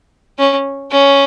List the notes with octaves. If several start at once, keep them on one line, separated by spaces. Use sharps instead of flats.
C#4
C#4